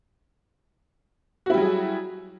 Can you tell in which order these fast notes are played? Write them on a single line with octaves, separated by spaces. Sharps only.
F#4 E4 G3 F#3 G#4